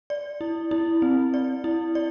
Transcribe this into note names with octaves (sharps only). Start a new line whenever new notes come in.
D5
E4
E4
C4
D5
E4
D5